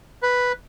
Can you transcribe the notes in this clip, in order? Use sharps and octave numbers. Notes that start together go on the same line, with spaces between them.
B4